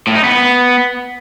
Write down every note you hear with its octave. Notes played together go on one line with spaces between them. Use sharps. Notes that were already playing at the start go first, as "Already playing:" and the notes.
A2
D#4
B3